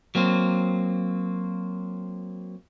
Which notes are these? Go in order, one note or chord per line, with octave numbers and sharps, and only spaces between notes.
F#3 A#3 C4